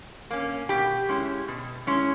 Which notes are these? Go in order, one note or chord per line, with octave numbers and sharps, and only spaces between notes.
A#3 C#4
B2 G4
G#3 C#4 E4
B2
G#3 C#4 E4